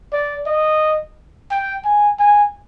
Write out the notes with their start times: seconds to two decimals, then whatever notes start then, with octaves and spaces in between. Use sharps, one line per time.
0.13 D5
0.47 D#5
1.51 G5
1.85 G#5
2.19 G#5